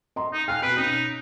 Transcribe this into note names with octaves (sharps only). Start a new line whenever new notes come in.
D#5 A#5 C6
D#4
F5 G5 G#5 F#6
B2 B4 D7
C#4 D#4